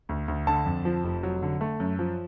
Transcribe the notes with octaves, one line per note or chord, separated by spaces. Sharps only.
D2
D2
D3 A5
F2
F3
F1
F#3
D3
A3
F#2
F3